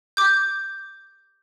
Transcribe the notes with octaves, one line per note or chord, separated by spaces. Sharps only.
D6 G6